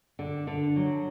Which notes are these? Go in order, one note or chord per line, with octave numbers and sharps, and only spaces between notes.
D3
D3
F#3